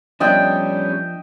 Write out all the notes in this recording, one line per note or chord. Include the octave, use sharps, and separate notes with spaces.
F3 G3 B3 C#4 D4 D#5 E5 G5